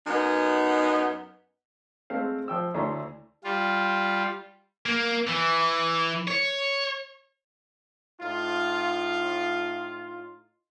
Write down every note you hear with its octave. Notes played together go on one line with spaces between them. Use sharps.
F#2 B3 D#4
G#3 A3 C4 C5 F5
F3 G5 E6
D2 A3 E4 C#5 A#5 C6
G3 F4
A#3
E3
C#5
A2 D#4 F4